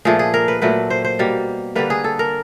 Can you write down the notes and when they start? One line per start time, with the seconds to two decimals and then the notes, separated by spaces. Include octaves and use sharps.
0.05 A#2 F3 A3 G#4
0.19 G#4
0.34 A#4
0.48 B4
0.62 A#2 F#3 A3 B4
0.90 C5
1.05 C5
1.19 B2 G3 A#3
1.76 D3 G3 A#3 B4
1.90 G#4
2.04 A4
2.19 A#4